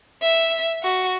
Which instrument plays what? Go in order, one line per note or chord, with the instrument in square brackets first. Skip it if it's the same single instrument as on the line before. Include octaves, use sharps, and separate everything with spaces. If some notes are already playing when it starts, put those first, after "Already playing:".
[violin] E5
F#4